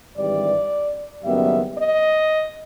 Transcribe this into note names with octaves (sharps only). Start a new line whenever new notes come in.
G#1 G2 E3 G3 D5
F#1 F#2 D#3 G3 B3 E5
D#5